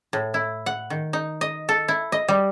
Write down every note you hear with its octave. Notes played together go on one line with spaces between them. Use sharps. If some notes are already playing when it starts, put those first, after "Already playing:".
A2
E4
F#5
D#3
D#4
D#5
A4
E4
D#5
G3